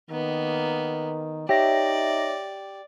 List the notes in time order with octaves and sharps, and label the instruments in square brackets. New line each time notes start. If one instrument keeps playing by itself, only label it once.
[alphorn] D#3 [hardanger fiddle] A#3 B3
[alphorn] D#4 [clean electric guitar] G4 [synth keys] C#5 E5 A#6 [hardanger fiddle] D5